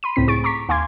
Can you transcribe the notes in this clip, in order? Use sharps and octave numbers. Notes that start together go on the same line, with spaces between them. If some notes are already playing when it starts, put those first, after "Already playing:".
B5 C6 D#7
C#2 A2 C4 B6
A2 G#4 C#6 A6 D7
A#5 C#6 D6 B6
D#2 F5 G#5 C6 D6 G#6